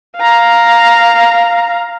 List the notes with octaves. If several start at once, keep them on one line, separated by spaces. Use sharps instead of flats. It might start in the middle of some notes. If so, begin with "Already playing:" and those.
F5 A#5